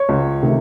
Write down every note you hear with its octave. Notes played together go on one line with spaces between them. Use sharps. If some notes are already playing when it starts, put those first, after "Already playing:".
Already playing: C#5
C#2
C3 D#3 A3